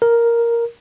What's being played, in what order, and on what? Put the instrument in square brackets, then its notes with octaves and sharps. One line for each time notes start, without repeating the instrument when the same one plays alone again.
[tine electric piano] A#4